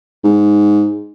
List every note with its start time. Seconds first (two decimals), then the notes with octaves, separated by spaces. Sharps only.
0.24 G#2